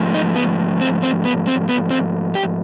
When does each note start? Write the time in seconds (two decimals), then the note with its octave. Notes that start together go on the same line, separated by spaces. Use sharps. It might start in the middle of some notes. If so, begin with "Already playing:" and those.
Already playing: G#2 F3 A3
0.14 D#4
0.36 B3
0.81 C4
1.03 C4
1.25 B3
1.47 C4
1.69 B3
1.91 C4
2.35 G4